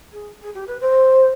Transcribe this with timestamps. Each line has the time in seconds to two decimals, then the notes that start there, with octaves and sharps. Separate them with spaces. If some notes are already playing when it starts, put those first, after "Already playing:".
0.12 G#4
0.40 G#4
0.54 G4
0.67 B4
0.81 C5